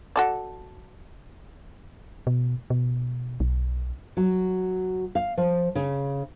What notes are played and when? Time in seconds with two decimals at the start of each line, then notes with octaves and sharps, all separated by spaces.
0.16 F#4 A4 D5
2.27 B2
2.70 B2
3.40 B1
4.17 F#3
5.15 F5
5.37 F3
5.75 C#3